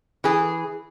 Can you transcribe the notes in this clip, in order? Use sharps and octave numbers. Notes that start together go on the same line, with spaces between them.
E3 G#4